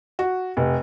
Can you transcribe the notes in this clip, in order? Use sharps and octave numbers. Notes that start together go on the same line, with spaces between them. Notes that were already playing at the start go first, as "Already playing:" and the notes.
F#4
F1